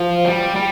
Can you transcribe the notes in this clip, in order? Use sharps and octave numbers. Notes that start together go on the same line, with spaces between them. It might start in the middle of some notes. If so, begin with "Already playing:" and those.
Already playing: F3
G3
G3